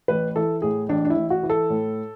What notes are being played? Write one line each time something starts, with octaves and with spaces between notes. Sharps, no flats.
A1 B4
E3 A4
A2 G#4
A1 D4
D4
E4
A1
F#4
E3
A4
A2